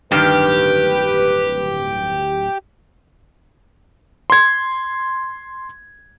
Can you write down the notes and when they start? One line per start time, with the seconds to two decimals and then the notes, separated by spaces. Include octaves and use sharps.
0.12 D1 G2 D#3 G4 B4
4.30 C6 G#6